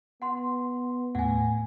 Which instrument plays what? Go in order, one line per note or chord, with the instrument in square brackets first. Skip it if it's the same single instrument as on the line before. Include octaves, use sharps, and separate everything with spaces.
[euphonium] B3 [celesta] F#5 C6
[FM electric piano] D#2 A2 A3 [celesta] F#5 G#5